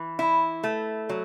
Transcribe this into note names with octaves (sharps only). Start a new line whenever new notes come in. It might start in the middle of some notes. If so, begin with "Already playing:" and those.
Already playing: E3
E4
A3
F#3